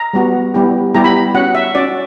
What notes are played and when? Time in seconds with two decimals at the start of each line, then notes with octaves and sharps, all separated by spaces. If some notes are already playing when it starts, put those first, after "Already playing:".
Already playing: A#5
0.13 G3 B3 F#4
0.54 G3 B3 E4 G4
0.94 G3 B3 E4 G4 A#5
1.04 B5
1.35 C#4 F#4 F#5
1.55 E5
1.75 C#4 F#4 D5